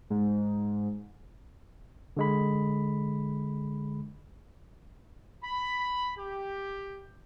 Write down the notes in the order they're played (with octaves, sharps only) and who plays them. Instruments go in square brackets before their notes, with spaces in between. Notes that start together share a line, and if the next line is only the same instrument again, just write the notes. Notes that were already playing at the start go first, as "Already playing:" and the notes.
[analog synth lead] G#2
[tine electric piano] D3 G#3 B5
[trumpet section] B5
G4